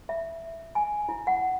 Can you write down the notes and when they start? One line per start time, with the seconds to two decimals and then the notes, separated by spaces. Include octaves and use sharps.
0.09 E5
0.75 G#5
1.09 E4
1.27 F#5